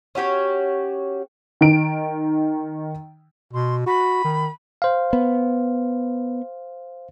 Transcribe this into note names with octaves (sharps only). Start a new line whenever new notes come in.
C#4 F#4 G4 C#5
D#3 D7
B2 C6
F#4 B5
D#3
C5 F5
B3